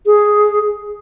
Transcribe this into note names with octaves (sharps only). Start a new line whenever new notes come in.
G#4